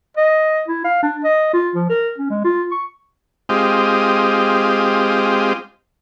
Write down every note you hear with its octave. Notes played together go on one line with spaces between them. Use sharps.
D#5
E4
F5
D4
D#5
F4
F3
A#4
C#4
G#3
F4
C#6
G#3 C4 F4 G4 D#5